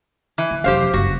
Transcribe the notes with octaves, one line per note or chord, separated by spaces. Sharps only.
E3
D3
F1 F#3 G4 C5 F5
F#1 G2 F#4